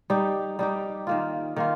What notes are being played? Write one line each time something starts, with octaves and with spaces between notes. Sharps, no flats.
G3 D#4 G4
G3 D#4 G4
D#3 A#3 F4
D#3 A#3 F4